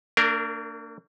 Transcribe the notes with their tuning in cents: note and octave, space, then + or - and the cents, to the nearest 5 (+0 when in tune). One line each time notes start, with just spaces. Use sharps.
A#3 -45 D4 +0 A#4 +0